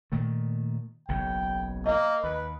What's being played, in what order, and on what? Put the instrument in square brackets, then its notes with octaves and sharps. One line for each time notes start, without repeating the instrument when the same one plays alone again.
[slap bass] A#2 D#3 A3
[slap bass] F#1 B1 C#3 [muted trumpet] G5
[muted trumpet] A#3 [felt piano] D#5
[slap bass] D#2 [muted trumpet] B4